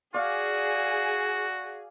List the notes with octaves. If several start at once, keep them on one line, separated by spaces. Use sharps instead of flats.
F#4 G#4 D5 F5